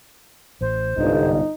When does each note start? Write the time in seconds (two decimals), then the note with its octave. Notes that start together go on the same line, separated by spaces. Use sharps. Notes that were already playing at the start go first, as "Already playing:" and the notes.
0.61 A1 A2 C5
0.98 G1 C2 G#2 D3 D#4